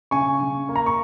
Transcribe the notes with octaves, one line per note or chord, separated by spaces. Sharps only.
C#3 G#5 C#6
C#3
A#3
A#5
C#6